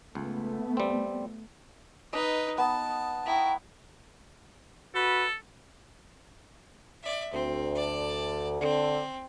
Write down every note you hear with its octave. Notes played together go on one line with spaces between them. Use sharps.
C#2 A3 B3
G3 C4
D#4 B4 D#5
B3 A5
E4 G5 A#5 C#6
F#4 A4 B4 B5
D5 E5
D2 C4
D5 A5
D3 C4